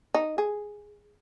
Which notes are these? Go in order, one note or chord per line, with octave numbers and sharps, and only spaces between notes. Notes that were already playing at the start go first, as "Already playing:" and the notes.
D#4
G#4